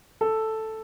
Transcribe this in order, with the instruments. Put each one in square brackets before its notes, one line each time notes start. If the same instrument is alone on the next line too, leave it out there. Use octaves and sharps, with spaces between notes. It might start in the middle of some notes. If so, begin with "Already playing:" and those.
[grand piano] A4